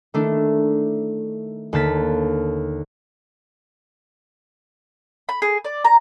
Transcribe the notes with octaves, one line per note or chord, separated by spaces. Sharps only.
D#3 A3 D4 E4
D#2 D3 A#3 A5 A6 B6
B5
G#4
D5
A#5